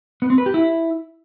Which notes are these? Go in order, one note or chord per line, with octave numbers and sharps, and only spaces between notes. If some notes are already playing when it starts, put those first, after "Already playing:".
B3
C4
B4
G4
E4